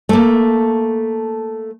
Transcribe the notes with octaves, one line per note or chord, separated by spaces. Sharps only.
A3 A#3